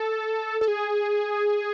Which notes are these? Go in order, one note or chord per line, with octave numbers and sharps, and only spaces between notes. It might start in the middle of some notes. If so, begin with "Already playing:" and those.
Already playing: A4
A4
G#4